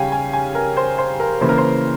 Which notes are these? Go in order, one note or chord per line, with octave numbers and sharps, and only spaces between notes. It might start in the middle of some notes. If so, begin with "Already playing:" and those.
Already playing: C#3 G3 C#4 F5 G5 G#5
G#5
G#5
A#4
C5
C5
A#4
C#3 E3 A#3 C5
A#4
C5